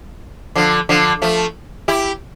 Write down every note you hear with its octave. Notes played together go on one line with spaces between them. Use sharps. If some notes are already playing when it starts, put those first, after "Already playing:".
D3 F3
D3 F3
F3 A3
E4 G4